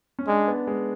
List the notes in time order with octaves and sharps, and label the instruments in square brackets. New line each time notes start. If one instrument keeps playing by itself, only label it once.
[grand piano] C#4
[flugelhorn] G#3 [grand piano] D4
[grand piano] B3
G#3